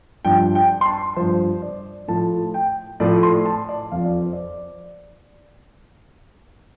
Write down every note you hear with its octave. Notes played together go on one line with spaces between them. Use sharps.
G2 F3 G5
G5
C6
A5
G2 F3 C5
D5
A2 F3 A5
G5
A2 F3 D5
C6
A5
D5
F2 F3 F5
D5
C5
D5